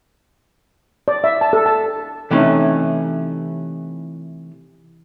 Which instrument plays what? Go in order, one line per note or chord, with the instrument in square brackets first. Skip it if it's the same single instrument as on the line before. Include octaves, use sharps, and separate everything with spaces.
[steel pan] D5
E5
A5
A4
A5
[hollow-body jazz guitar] C3 E3 A3 C#4 D#4